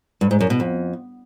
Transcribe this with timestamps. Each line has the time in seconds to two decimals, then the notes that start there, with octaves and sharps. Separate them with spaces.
0.21 G2
0.31 G#2
0.40 F#2
0.50 B2
0.60 F2